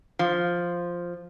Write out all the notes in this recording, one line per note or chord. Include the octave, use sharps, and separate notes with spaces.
F3